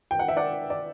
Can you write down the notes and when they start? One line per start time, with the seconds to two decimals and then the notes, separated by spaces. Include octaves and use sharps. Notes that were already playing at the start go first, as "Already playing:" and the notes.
0.11 G5
0.19 F#5
0.28 E5
0.37 D5 F#5
0.70 D5